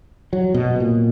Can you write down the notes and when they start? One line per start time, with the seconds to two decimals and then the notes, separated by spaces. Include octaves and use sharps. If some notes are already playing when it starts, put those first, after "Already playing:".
0.33 F#3
0.54 B2
0.80 A#2